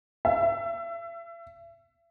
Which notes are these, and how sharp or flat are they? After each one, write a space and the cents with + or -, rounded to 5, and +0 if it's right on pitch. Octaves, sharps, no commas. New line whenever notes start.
E5 +30